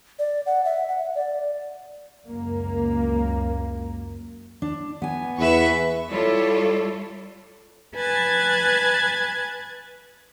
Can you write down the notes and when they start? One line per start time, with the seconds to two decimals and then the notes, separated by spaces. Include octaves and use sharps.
0.19 D5
0.46 F#5
0.65 E5
0.89 F#5
1.15 D5
2.27 C#2 F#2 A#3
4.62 D4
5.02 B3 G#5
5.39 E2 B4 E5 C#6
6.10 G3 E4 F4 A4 C#5 D5
7.95 B4 G#5 A5 F#6 G#6 A6